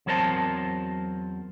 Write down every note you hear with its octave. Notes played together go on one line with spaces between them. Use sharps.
E2 F#3 C4 A#4 C5 A5